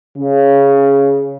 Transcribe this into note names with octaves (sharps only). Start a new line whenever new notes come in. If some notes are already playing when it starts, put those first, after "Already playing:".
C#3